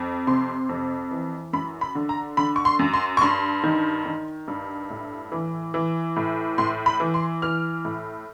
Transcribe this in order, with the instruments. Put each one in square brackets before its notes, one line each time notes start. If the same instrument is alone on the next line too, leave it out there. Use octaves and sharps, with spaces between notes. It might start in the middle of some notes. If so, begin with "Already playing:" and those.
Already playing: [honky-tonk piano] F2
C3 C6
F2
E3
F#2 B5
B5
D3
A#5
D3 B5
C#6
C6
F#2
C6
C#6
G2 C6
D#3
D#3
G2
A2
E3
E3
A2
A2 C6
B5
E3
C6
E3 F6
A2